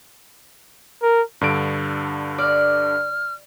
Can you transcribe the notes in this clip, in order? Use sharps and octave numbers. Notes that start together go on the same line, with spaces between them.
A#4
G2 D3 D7
D5 F6